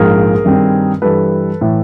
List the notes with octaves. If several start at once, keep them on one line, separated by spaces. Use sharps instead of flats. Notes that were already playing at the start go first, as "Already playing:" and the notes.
Already playing: A#1 G#2 F3 A#3 G#4 A#4
G2 D#3 G3 C4
G2 E3 G3 A4 B4
A2 E3